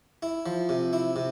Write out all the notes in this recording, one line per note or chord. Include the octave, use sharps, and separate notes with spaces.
E4
F3
C3
E4
C3